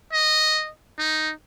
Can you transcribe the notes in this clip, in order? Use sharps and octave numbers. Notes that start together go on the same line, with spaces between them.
D#5
D#4